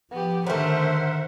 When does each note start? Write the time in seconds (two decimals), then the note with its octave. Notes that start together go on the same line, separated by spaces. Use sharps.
0.11 F3 B3 G4
0.46 D3 D#3 F#3 A3 A#4 C5 E5 F#5